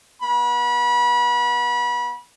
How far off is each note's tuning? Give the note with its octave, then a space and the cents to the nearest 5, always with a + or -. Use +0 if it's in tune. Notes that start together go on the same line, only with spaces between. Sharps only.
B3 -35 B5 -30